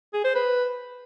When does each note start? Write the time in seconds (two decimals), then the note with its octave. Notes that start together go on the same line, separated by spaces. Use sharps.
0.14 G#4
0.24 C5
0.35 B4